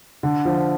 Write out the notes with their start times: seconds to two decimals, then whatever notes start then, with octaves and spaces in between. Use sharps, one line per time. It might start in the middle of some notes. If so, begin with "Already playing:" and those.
0.23 D3
0.45 F3